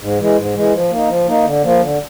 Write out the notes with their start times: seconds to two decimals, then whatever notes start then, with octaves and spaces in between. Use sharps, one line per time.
0.01 G#2
0.19 E3 G#3
0.37 G#2
0.55 E3 G#3
0.73 F3
0.91 A#3 D#4
1.09 F3
1.27 A#3 D#4
1.44 D3
1.64 F3 A#3
1.81 D3